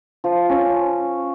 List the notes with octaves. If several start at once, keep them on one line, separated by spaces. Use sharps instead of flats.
F3
C#4